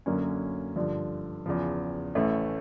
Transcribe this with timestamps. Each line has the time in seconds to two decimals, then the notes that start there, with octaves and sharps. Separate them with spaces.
0.06 F#2 D3 F#3 A#3 C#4
0.76 G2 D3 F3
1.46 E2 C#3 F3
2.15 A1 A2 E3 A3 C#4